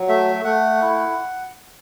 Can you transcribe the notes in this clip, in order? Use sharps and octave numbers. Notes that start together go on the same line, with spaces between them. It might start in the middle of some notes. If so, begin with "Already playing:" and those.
Already playing: F#3
A3 E5
A3 F#5
E4